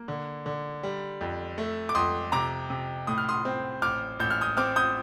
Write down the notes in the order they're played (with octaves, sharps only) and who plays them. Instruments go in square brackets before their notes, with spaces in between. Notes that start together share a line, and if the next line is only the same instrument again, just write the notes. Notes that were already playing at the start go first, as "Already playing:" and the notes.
Already playing: [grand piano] A#3
D3
D3
G3
F2
A3
D6
F2 C6 D#6
C3 A#5 D6
C3
A2 D#6
F6
C6 D#6
C4
A1 D6 F6
A1 G6
F6
D#6 G6
C4 D6 F6
D#6 G6